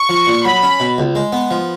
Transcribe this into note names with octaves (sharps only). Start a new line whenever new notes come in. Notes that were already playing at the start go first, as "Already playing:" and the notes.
Already playing: C#6
F3
A#2
F#3 B5
C#4
B2
C#2
G#3
B3
F3